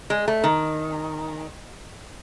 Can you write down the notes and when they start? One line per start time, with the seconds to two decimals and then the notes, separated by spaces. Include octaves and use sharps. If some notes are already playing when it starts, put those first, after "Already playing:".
0.10 G#3
0.28 A3
0.44 D#3